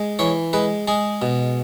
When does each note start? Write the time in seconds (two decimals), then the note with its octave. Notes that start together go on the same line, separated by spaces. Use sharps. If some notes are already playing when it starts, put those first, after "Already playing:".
Already playing: G#3
0.19 E3 C#5
0.53 G#3 B4
0.88 G#3 G#4
1.22 B2